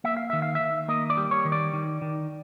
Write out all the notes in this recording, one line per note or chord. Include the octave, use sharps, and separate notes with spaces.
A#3 E5
F5
D#3 E5
F5
E5
D#3
A#3 D#5
D5
G3
C#5
D#3
D5
D#3
D#3